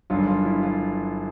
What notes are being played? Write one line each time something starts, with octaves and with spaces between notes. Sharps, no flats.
G1 G2 D#3 F#3 F4
F4
E4
F4